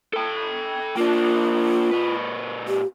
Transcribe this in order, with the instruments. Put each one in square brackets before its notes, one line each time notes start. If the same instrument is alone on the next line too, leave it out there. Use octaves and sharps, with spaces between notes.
[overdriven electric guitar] A4 G5
[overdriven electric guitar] A#3 D4 [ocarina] F4
[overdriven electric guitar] A#2 B4
[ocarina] G4